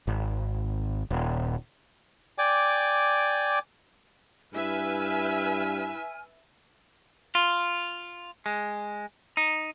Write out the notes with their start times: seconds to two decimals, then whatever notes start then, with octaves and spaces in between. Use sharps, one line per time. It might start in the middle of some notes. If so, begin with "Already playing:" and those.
0.07 G#1
1.11 D#1
2.38 D5 G5 G#5 D6
4.53 G2 E4 B4 E5 G#5 F6
7.35 F4
8.46 G#3
9.37 D#4